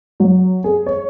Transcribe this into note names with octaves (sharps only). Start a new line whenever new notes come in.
F#3
G#4
C#5